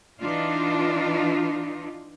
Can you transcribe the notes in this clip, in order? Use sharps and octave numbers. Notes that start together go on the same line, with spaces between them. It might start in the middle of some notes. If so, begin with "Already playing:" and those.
E3 D4 D#4 F4